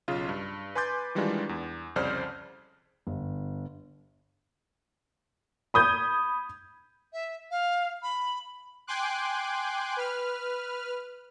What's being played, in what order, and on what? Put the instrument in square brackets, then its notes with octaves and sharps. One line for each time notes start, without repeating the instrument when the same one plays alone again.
[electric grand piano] B1 C#3 F4
G2
B4 G#5 C6 D6 G6 A6
D#3 E3 G3 G#3 D4 F4
E2
C2 F2 C#3 C5 D5 F6
[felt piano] G1
[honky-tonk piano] B5 D#6 G6 G#6
[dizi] E5
F5
B5
[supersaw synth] G5 G#5 C6 D6 F#6
B4 F6